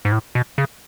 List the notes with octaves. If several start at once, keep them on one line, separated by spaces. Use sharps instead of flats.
G#2
A2
B2
C#3